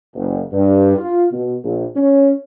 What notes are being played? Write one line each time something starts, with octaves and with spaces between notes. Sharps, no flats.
F#1
G2
F4
B2
A#1
C#4